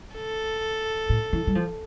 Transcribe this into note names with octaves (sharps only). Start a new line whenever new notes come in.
A4
A2
E3
G3
F3